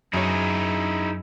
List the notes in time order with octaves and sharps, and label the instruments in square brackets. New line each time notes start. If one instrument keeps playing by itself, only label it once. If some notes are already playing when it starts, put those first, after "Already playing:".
[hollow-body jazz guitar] F#2 C#5 [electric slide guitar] D#4 E4 G#4